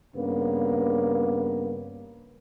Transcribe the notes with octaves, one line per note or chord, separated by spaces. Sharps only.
G2 C#3 A#3 B3